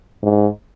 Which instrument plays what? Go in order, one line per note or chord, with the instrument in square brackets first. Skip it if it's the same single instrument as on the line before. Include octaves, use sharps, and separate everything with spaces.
[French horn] G#2